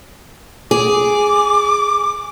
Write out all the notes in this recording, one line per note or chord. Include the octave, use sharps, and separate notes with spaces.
G#4 D6